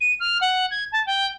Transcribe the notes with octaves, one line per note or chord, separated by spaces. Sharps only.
D#7
F6
F#5
G#6
A5
G5